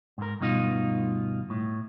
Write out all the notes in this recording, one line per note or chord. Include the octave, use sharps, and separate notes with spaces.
G#2 A#4
D2 G2 B2 D#4 F4
A2